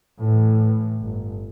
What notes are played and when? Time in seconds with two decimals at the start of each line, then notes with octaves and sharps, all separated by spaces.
0.18 A2 E3
1.00 G1